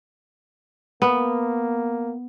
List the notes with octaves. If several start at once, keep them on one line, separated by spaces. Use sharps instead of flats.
A#3 B3